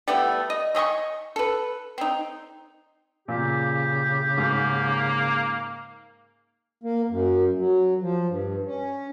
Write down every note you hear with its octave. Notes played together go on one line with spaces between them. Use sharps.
G3 A3 B3 E4
D#5
A3 D#5 G#5 C#6
A4 B4
C4 D#4
A#2 C#3 G4
G#2 A#3
A#3
F#2
F#3
F3
G2
C#4